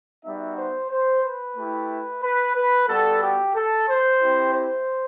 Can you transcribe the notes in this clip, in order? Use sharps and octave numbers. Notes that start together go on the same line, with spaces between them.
G3 B3 D#4 F#4 E5
C5
C5
B4
A3 E4 G4
B4
B4
G3 B3 F#4 A4
G4
A4
C5
C4 E4 G4
C5